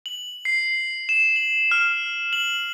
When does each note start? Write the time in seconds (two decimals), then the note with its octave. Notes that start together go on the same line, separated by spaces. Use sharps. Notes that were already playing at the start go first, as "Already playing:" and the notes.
0.06 F#7
0.45 C7
1.09 E7
1.36 F#7
1.71 F6
2.33 F#7